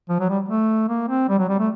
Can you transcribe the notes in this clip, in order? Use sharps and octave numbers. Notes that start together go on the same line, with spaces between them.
F3
F#3
G3
A3
A#3
C4
G3
F#3
G3
A3